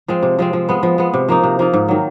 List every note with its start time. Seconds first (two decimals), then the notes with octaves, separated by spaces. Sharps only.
0.08 F3 G#3 C4
0.23 C3
0.39 F3 G#3 C4
0.53 F3
0.69 G#3 B3
0.83 F3
0.98 G#3 B3
1.14 C3
1.29 F3 A#3 D#4
1.44 C3
1.59 F3 A#3 D#4
1.74 G#2
1.88 D#3 F#3